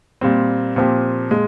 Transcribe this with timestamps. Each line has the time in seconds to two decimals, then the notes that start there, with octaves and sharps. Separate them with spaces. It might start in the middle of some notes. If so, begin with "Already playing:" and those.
0.21 A#2 G3 C4
0.76 A#2 F3 C4 G4
1.31 A#2 G#3